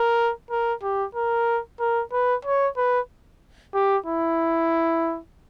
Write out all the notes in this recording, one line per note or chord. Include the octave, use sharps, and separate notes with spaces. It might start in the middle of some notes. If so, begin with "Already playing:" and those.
Already playing: A#4
A#4
G4
A#4
A#4
B4
C#5
B4
G4
E4